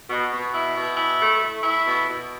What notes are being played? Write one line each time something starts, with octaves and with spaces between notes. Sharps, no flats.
B2
B2
E4
B2
E4
A3
A3
E4
B2
B2